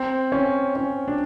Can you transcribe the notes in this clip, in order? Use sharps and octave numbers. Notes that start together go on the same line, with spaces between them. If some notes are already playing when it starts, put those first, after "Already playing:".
Already playing: C4
C#4
C#4
D4